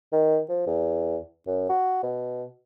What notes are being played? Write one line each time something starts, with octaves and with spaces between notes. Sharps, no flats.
D#3
F3
E2
F#2
F#4
B2